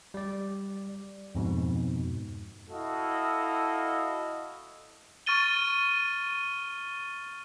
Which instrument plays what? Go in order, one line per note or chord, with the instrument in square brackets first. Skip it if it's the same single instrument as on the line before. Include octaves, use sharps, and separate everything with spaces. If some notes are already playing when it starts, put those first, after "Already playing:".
[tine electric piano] G3 D5
F2 G#2 B2
[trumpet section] E4 F#4 A4 D#5 F5
[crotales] C#6 F6 A6 D#7 G7